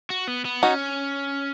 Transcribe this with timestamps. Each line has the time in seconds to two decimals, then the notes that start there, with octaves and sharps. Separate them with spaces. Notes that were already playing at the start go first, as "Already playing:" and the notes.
0.10 F#4
0.28 B3
0.45 B3
0.63 C#4 D#4 F#4